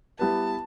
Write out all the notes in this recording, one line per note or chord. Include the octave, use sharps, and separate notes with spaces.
G3 B3 E4 G4 B4 A5